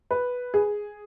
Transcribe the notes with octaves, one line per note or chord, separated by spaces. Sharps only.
B4
G#4